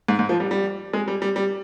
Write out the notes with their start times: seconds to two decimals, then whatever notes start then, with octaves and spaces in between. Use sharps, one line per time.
0.08 G#2
0.19 G#2
0.29 F3
0.40 G3
0.51 G3
0.93 G#3
1.08 G3
1.22 G3
1.36 G3